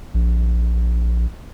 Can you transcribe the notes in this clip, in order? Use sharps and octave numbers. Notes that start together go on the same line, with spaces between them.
A#1